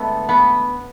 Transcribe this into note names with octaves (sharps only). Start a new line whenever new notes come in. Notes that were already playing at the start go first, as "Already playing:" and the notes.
Already playing: D3 G#3 A3 B3
B3